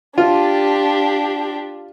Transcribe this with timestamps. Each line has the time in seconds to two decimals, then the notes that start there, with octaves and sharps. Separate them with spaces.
0.18 D4 F4 G4